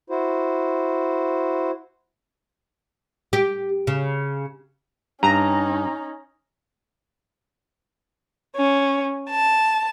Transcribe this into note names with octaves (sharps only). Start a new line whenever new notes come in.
E4 F#4 C5
G4
C#3
G2 C#4 D#4 A#5
C#4
A5